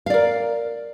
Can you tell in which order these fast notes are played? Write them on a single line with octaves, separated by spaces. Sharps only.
F5 D5 A#4